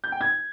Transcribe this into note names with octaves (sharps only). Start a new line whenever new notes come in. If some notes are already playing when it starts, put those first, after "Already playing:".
G6
G5
G#6